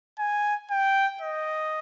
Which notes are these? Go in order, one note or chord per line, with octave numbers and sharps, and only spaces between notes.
G#5
G5
D#5